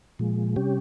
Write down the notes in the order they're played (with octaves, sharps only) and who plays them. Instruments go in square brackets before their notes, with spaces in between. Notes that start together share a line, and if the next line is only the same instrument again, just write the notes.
[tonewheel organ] A#2 F3 G#3
C3 G3 C#4 G4